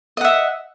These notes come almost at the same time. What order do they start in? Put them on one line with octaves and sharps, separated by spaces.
D#5 F#5 E5